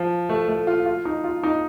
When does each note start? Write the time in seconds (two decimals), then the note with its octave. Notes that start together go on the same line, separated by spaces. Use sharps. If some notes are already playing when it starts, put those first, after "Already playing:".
Already playing: F3
0.29 A3
0.48 A3
0.67 F4
0.86 F4
1.05 D#4
1.24 F4
1.43 D#4